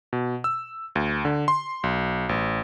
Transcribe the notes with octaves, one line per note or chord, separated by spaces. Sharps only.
B2
E6
D2
D3
C6
B1
A1